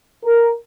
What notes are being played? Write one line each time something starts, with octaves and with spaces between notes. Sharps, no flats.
A#4